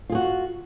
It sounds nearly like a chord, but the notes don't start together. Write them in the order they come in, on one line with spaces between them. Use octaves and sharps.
F4 G#4 F#4